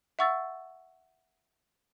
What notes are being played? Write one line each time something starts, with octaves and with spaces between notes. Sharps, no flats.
E5 F#5 C#6 E6 A6